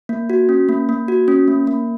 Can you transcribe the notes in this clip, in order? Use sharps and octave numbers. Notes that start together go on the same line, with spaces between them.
A#3
F#4
C#4
A#3
A#3
F#4
C#4
A#3
A#3